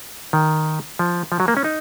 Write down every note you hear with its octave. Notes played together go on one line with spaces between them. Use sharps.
D#3
F3
F3
F#3
A#3
C#4
D#4